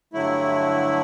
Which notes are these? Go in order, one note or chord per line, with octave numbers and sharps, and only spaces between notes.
G2 D3 F#3 A3 E4